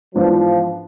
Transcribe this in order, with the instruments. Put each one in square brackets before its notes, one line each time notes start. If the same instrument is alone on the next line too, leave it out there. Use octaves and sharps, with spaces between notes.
[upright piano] G#2 E3 B3 D4 [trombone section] F3